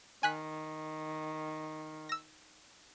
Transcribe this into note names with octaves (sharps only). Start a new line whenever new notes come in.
D#3 G#5 F#6 B6
E6 A#6